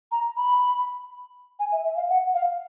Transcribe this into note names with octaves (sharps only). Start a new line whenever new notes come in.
A#5
B5
G#5
E5
E5
F5
F#5
F5